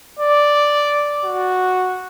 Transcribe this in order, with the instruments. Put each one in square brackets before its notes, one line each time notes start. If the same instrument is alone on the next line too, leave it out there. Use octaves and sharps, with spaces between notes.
[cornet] D5
F#4